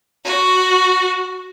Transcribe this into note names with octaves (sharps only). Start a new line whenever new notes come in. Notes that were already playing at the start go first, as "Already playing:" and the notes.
F#4